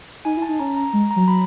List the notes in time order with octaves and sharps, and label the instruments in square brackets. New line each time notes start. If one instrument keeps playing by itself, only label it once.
[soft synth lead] D#4 [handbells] G#5
[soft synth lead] E4
[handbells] A5
[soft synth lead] D#4
[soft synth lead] C#4 [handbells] A#5
[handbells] A#5
[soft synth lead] G#3
[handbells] A#5
[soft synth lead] F#3
[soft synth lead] F#3 [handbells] B5